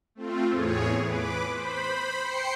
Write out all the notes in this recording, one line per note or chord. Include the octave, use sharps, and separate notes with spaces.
A3 C4 F4
E2 A2 G#4 C#5
B4 D6
C5 B5
C5 G5 C7 C#7